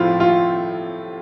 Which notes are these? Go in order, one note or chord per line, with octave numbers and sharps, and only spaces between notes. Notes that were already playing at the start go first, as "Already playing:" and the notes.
Already playing: A2 F3 C4 E4 F4
F4